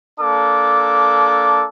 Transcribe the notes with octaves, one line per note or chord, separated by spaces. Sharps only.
A#3 D4 A4 D6